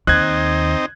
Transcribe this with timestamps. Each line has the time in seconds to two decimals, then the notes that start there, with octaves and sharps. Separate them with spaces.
0.07 D#2 C4 D#4 F#6 G#6